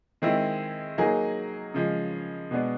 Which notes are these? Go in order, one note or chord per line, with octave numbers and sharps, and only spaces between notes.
D#3 G#3 C4 E4
F#3 A#3 D#4 G#4
C#3 F3 G#3
B2 G#3 B3 D4